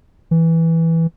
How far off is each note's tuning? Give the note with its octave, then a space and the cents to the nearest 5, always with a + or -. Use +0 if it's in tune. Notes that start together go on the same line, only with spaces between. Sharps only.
E3 -5